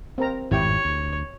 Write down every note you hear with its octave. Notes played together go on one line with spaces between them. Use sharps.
C4 A#4 A#5
G#1 F2 A2 E4 G4 C#5 G5
D2